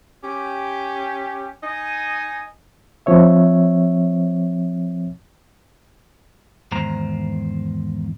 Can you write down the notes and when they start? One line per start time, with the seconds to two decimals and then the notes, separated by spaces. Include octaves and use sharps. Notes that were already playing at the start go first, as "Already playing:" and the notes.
0.24 C#4 G4
1.62 D#4 D#5 G#5
3.06 F3 C4 C#5 E5
6.72 E2 G#2 D#3 C5 A#5